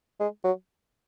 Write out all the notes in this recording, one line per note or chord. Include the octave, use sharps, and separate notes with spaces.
G#3
F#3